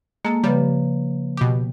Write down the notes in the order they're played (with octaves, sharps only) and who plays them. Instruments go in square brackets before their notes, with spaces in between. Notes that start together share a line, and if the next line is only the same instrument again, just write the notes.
[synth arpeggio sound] G#3 A4 [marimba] A#3
[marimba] C#3 F3 B4 [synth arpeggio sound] G3
[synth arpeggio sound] B2 G4